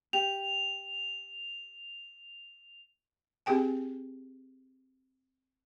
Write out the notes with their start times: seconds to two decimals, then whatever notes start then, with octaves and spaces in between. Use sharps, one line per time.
0.13 G4 F7
3.46 C4 G4 G#4 G5 G#5